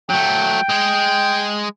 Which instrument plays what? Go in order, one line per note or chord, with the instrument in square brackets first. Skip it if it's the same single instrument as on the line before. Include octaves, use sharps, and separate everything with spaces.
[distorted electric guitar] F#3 A3 [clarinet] G5
[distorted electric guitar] G#3 G#4